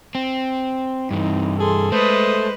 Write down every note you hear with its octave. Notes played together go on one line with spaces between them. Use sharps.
C4
G2 E3 C4 D#4
G#4 A4 C6
G#3 A3 B4 C5 D#6